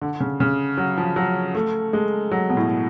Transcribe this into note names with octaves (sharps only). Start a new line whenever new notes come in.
D3
C#3
C#3
F#3
F3
F#3
A3
G#3
F#3
B2
A2